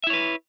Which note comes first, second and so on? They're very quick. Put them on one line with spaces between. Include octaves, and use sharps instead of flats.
E5 E4 C#5 B4